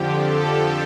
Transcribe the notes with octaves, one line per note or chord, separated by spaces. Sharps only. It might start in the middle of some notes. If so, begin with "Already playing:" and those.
Already playing: F2 D3 F3 G4
A4